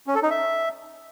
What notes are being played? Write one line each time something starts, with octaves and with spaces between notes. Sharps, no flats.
C#4
A4
D#4
E5